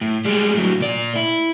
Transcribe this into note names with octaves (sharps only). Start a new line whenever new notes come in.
A2
G3 G#3
A2 F#3
A#2 D5
E4